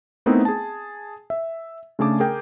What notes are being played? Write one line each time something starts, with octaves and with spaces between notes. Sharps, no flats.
A3 B3 C4 D#4 E4 A#4
G#4 A5
E5
C#3 A3 D4 G#4 A5 D6
G#4 A#4 G5